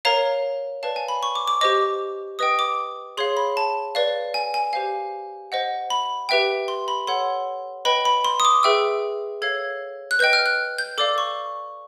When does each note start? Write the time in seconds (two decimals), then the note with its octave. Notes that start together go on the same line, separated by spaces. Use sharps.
0.05 A#4 C#5 F5 A#5
0.83 B4 D5 F5 A5
0.96 G#5
1.08 B5
1.23 C#6
1.35 D6
1.48 D6
1.61 G4 C5 D#5 D6
2.39 B4 D#5 G5 D#6
2.59 D6
3.17 G#4 C#5 F5 C6
3.37 B5
3.57 A5
3.95 B4 D5 F5
4.34 G#5
4.54 G#5
4.73 G4 C5 F5 G#5
5.52 C5 D#5 F#5
5.90 B5
6.29 G4 B4 E5 G5
6.68 C6
6.88 B5
7.07 A4 C#5 F#5 C6
7.85 B4 D#5 G5 B5
8.05 B5
8.25 C6
8.40 D#6
8.45 D6
8.63 G#4 B4 E5 G5 E6
9.42 A4 C#5 F5 G#6
10.11 F#6
10.19 B4 D#5 G5 G6
10.33 F6
10.46 F#6
10.78 G6
10.98 A4 D5 F5 D6
11.18 C#6